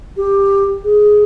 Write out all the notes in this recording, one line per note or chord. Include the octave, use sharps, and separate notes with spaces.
G4
G#4